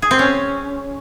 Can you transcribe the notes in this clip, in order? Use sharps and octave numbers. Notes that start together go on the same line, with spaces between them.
G#4
C4
C#4